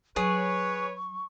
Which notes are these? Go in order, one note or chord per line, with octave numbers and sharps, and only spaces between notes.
F#3 G#4 B4 C#5 C#6